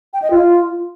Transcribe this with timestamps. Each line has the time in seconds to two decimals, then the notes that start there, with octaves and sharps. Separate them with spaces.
0.13 G5
0.22 D#5
0.31 F4